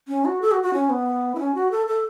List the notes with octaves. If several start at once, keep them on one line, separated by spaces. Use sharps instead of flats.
C#4
F#4
A4
F#4
F#4
C#4
B3
E4
C#4
F#4
A4
A4